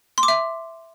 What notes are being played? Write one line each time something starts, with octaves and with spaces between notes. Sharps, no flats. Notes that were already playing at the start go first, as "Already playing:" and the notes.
C6
D6
E5